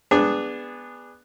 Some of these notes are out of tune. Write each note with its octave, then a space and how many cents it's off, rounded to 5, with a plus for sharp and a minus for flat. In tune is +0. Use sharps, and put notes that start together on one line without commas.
B3 +0 D4 +0 G#4 -25